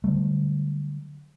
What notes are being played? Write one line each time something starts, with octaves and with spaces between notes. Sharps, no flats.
D3 F#3 G3 A3